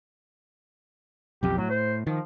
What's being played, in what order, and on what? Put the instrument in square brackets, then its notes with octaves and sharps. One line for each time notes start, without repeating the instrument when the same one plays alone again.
[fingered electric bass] B1 F2 [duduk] G4
[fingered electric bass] A2 [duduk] F#3
[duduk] C5
[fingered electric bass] D#3 [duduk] F3